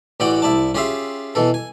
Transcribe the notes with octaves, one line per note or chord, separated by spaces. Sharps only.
A1 E3 F#4 D5 F#5 G5
C2 E4 D5 A5
C#4 F4 G4 G#4 E5 F5
B2 E3 A4
G#5